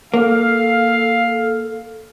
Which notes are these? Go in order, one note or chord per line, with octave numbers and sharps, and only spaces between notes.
A#3 A4 F5